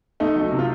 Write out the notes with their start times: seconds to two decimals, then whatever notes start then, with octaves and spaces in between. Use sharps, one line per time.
0.20 A3 D#4
0.36 F#3
0.41 D#4
0.52 C3
0.59 F4